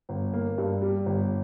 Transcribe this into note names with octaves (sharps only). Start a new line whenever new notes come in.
G1
A#3
G2
G3
G1